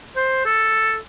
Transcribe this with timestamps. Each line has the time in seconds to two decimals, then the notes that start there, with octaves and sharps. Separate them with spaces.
0.16 C5
0.45 A4